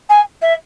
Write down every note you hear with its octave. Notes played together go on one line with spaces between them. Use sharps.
G#5
E5